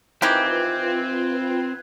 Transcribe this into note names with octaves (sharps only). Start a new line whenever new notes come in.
D#3 E3 C4 F4 G4 B4 F#6 G#6